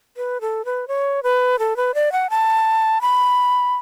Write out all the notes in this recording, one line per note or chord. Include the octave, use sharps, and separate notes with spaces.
B4
A4
B4
C#5
B4
A4
B4
D5
F#5
A5
B5